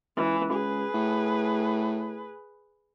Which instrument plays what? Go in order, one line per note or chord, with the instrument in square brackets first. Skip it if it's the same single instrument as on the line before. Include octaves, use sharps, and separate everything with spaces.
[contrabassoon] C#2 [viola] E3
[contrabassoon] C#2 [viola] G#4 B4
[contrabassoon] A2